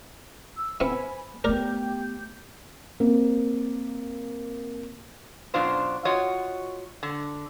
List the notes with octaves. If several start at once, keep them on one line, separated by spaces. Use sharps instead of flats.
E6
B3 C4 E4 G#5 B5
A3 B3 G4 A#4 D5 G6
A#3 C4
F#2 B2 D4 F4 C5
F4 F#4 C#5 D#5
D3